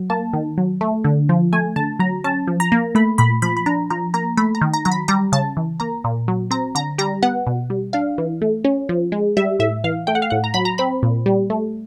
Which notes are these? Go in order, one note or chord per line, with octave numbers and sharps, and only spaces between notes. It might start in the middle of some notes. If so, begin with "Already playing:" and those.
Already playing: F#3
A#3 A5
D#3
F#3
A3
D3
F3
A3 G#5
D3 A5
F#3 A#5
C#4 A5
F3
A#5
A#3
A3 B5
A#2 B5
F3 B5
B5
D4 A#5
F3 A#5
A#3 A#5
A3 B5
A#5
D#3
A#5
F#3 A#5
B5
G3 A#5
C#3 A5
E3
A#3 A#5
A#2
F#3
C4 A#5
D3 A#5
G3 A#5
B3 F#5
B2
G3
D4 F5
E3
A3
C#4
F3
G#3
G3 E5
A2 E5
E3 F5
A3 G5
F#5
F5
A2 F#5
A#5
F#3 B5
A#5
C4 B5
A#2
G3
A3